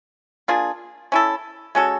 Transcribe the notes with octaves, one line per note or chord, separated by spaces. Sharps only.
A#3 D4 F4 G#4
C#4 E4 A4
G#3 C#4 F#4 A4